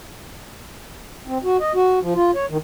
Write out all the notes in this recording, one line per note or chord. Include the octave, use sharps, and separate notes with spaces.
C4
F#4
D#5
F#4
F3
F4
C#5
D#3